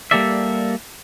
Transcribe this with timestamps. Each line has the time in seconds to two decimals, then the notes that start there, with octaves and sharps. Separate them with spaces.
0.11 G3 A#3 G4 A4 D5 E5